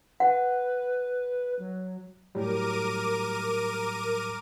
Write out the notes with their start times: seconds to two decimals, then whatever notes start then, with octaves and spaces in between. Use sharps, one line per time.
0.20 B4 F#5
1.59 F#3
2.35 A2 F#3 G3 A#4 D6 D#7